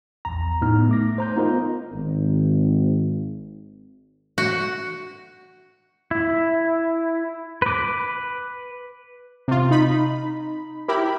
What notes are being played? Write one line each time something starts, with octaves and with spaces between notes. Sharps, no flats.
A#1 E2 A#5
A2 B3 D#4 F6
A3 D6 A#6
C5 A#5 G6
B3 D#4 F4 A#4 D#5
G#1
F#4
E4
B4 D6
C3 F4
D#4 B5
E4 G4 A#4 B5